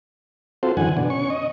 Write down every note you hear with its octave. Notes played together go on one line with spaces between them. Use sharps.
C4 F4 F#4 A4 C5
F#2 D3 E3 F#5 G#5
B2 D4
C#4 C#6
D#5